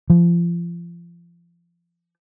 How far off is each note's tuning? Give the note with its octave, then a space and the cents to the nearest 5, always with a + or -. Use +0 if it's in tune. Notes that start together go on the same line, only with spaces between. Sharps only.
F3 -30